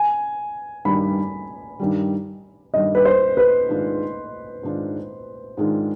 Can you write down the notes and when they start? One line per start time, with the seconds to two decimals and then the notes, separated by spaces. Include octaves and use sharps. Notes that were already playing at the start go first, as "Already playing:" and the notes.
Already playing: G#5
0.85 G2 D#3 G3 B5
1.79 G2 D#3 G3
2.74 G2 D#3 G3 D#5
2.95 B4
3.05 C5
3.37 B4
3.69 G#2 D#3 G#3 D4 F4
4.63 G#2 D#3 G#3 D4 F4
5.57 G#2 D#3 G#3 D4 F4